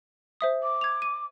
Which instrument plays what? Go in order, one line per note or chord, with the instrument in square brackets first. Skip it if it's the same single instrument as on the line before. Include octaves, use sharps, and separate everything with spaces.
[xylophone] C5 E5 D#6
[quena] D6
[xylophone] G#6 F7
D#7